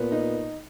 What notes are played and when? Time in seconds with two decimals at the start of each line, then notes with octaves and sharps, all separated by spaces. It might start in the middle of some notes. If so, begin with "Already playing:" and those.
Already playing: A#2 B3
0.12 D#4